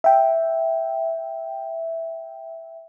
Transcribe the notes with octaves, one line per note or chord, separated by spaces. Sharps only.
E5 G5